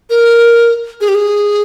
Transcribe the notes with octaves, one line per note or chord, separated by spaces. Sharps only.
A#4
G#4
G4
G#4